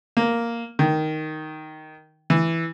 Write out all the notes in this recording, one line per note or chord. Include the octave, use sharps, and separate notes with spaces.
A#3
D#3
E3